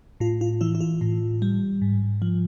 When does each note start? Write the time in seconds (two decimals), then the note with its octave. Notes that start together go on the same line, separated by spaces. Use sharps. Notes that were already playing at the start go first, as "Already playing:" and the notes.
0.20 A2 F4
0.41 F4
0.61 E3 E4
0.75 E4
0.81 F4
1.01 A2
1.42 G3
1.82 G#2
2.22 F3